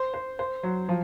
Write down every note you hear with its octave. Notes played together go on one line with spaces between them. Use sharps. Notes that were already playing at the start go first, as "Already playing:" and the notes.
Already playing: C5
C5
C5
F#3
F3